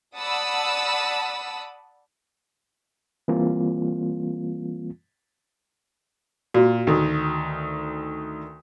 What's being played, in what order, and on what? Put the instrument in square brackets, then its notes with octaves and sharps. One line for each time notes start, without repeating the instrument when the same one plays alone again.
[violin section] D5 F#5 A5 B5 D#6 E6
[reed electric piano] E3 G3 A#3 C4 F4
[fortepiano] A#2 [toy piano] F#4
[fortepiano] D2 D#3